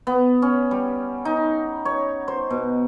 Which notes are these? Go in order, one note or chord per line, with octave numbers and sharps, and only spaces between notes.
B3
C#4
G3
D#4
C#5
C5
B2